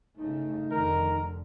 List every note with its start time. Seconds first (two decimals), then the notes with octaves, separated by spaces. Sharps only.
0.17 G1 C#3 A3 D#4
0.71 F1 F2 D3 D#3 A#4